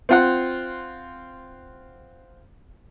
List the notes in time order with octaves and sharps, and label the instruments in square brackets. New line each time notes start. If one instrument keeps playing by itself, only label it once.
[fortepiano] C4 F4 F#5